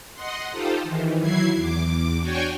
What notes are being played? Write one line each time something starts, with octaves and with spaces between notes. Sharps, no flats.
D#5 F#5 C6
D#4 F4 G4 A4 C5
D#3 E3
F#3 E4 G#6 C7
E2 D6
D4 F#4 C#5 G5 G#5 C#6